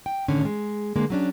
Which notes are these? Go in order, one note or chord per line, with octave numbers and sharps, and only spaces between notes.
G5
A2 D3 D#3 C#4
G#3
D3 G#3 A#3
F#3 C#4 D4